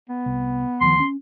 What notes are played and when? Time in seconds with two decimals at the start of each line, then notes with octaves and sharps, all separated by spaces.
0.10 B3
0.26 C2
0.81 D2 D#3 F3 C6
1.00 C#4